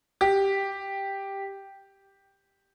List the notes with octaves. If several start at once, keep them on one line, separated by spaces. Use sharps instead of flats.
G4